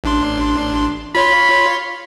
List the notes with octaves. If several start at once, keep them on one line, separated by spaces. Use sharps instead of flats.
A1 D4 C6
F4 C#5 B5 C6